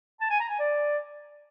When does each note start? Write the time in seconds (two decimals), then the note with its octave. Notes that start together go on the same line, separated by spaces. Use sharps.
0.20 A5
0.30 G#5
0.40 A#5
0.49 G#5
0.59 D5